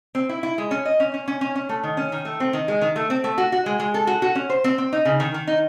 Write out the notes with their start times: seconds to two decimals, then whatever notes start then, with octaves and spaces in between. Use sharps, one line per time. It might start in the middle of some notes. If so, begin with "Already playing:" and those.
0.15 C4
0.29 E4
0.43 E4
0.58 G#3
0.71 C#4
0.85 D#5
1.00 C#4
1.14 C#4
1.28 C#4
1.41 C#4
1.55 C#4
1.69 A3
1.83 D#3
1.97 C#4
2.12 D#3
2.25 A3
2.40 C4
2.53 D#3
2.68 G#3
2.81 D#3
2.96 A3
3.10 C4
3.24 A3
3.38 F#4
3.52 F#4
3.66 G#3
3.80 G#3
3.94 A4
4.07 F#4
4.22 F#4
4.35 C#4
4.50 C5
4.64 C4
4.78 C4
4.93 D#4
5.05 C#3
5.20 D#3
5.34 D#3
5.47 D#4